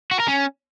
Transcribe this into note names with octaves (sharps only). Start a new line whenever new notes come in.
F#4
A#4
C#4